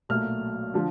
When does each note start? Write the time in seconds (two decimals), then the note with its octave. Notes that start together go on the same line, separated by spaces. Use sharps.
0.09 B1 A#2 F#3 A3 F6
0.74 D3 F3